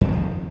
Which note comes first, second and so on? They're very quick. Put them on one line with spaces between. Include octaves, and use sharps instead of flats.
F2 F#3 D#3 F3